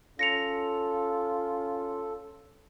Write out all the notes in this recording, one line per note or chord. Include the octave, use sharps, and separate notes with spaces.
C#4 F4 A4 A#6 C#7 F7